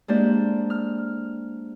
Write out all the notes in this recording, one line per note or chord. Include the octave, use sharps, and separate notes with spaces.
G#3 A#3 D4 G4 C5 D5
F6